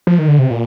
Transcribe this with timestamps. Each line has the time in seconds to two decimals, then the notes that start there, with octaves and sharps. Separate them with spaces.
0.07 F3
0.19 D#3
0.28 D3
0.39 C3
0.51 A#2